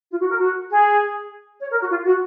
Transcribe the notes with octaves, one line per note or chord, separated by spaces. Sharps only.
F4
F#4
A#4
F#4
G#4
C#5
A#4
F#4
F4
F#4